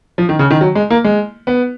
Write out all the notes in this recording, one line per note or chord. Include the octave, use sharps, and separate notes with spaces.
F3
D#3
C#3
D#3
F#3
G#3
A#3
G#3
B3